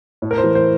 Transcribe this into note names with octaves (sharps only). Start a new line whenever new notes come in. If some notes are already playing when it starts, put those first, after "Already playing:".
A2
A#4
C5
E3
C5